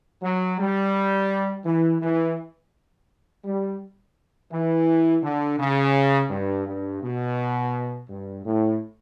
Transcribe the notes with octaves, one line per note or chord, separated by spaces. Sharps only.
F#3
G3
E3
E3
G3
E3
D3
C#3
G2
G2
B2
G2
A2